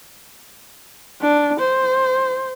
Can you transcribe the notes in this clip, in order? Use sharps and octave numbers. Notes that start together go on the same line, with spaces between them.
D4
C5